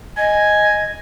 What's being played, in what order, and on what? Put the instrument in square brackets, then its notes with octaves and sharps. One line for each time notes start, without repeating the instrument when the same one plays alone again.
[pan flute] D#5 [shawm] G#5